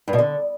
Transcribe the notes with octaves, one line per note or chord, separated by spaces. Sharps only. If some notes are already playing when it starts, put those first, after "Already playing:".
G2
B2
D3